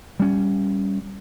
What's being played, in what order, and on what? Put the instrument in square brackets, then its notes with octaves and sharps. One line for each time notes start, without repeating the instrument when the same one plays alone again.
[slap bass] G3 C#4